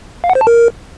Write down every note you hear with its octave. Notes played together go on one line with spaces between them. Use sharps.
F5
F#5
C5
A5
A#4